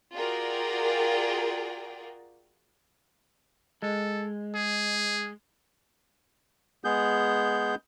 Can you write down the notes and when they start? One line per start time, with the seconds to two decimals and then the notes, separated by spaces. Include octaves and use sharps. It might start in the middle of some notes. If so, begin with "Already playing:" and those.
0.14 F4 F#4 G#4 A#4 D5 G5
3.82 G#3 A4
4.55 G#4
6.84 G#3 B3 G#4 G6